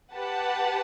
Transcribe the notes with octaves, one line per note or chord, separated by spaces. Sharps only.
G4 B4 F#5 A5